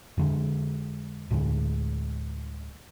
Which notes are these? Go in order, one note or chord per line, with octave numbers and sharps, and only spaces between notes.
F2 D3 G#3
D2 A2 D3 G#3